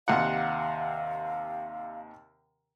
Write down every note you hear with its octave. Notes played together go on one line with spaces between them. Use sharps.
D#2 C3 F5 F#5